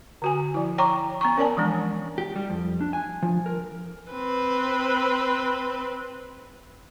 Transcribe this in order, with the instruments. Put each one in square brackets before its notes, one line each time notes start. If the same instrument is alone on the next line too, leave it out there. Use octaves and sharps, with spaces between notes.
[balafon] D3 F#4 G#5
F3 E4
C#5 G5 A#5 C#6 D6
B3 A#5 C#6
C#4 A#4 C#5 D5 G#5 A5
E3 F3 G#3 D4
[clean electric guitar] G4
G3
F2
D4
G#5
F3
A#4
[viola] C4 B4